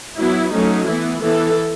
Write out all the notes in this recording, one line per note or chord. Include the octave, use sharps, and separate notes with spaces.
F#3 B3 E4
F#3 A3 C#4 D#4
E3 B3 E4
E3 B3 A4